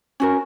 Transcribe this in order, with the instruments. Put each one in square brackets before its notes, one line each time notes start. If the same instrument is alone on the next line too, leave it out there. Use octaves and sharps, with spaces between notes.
[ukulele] C#4 F#4 A#4